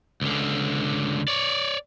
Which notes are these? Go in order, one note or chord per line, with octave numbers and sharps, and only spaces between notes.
C#2 D3
C#5 D5